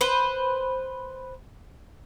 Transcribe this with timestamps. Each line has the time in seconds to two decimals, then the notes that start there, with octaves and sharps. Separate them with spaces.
0.01 B4 C5